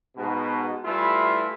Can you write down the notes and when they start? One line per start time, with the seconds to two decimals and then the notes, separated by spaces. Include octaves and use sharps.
0.17 G#2 B2
0.85 E3 G3 A3 E4 F4